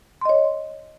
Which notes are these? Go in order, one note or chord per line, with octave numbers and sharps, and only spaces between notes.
C#5 D#5 C6